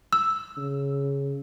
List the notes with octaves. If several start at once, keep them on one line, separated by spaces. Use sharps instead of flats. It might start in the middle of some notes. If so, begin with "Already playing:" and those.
E6
C#3